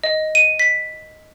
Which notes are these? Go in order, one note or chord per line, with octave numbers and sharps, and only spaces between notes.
D#5
D#7
B6